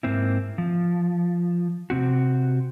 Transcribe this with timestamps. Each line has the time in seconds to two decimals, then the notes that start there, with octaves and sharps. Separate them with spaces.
0.03 G#2 A#3 C4 E4
0.58 F3
1.90 C3 C4 F#4